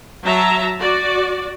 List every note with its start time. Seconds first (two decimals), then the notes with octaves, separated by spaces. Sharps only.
0.24 F#3 E5 A5 A#5
0.79 F#4 D5